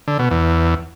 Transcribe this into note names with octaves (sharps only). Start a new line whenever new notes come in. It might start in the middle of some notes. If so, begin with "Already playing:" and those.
D3
B2
E2